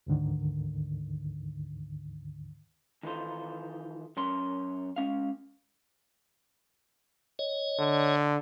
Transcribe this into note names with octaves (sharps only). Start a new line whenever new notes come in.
D2 G#2 D3 D#3
D#3 E3 D#4 F4 A4 C5
F#2 C#4 A#4 C6
G#3 C#4 F5
C#5 D#5
D3